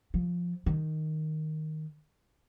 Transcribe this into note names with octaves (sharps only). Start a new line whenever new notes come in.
F3
D#3